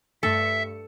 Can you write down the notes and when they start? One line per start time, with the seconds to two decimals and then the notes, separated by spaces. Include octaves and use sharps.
0.23 G2 A3 A4 E5 C#7